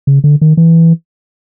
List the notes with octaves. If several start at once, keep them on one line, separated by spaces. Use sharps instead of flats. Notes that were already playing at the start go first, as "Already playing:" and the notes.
C#3
D3
D#3
E3